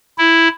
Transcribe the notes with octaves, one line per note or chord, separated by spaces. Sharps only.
E4